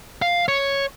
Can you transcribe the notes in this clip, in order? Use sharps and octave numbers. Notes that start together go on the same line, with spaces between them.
F5
C#5